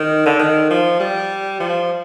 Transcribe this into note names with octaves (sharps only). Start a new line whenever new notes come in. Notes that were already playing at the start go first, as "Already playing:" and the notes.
Already playing: D#3
D3
D#3
F3
G3
F3